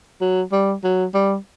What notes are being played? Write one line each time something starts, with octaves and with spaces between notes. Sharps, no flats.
F#3
G3
F#3
G3